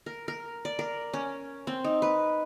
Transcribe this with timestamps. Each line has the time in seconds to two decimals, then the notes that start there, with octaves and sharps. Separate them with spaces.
0.06 A#4
0.28 A#4
0.65 D5
0.79 A#4
1.14 C#4
1.67 C4
1.84 D#4
2.02 B4